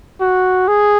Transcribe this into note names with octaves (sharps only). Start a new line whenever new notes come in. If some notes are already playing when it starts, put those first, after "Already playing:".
F#4
G#4